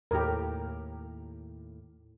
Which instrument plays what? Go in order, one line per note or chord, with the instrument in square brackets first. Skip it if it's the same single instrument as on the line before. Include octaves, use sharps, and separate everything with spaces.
[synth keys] D#2 A2 [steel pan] G4 A#4